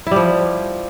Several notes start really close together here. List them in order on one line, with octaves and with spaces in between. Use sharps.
E4 G3 F3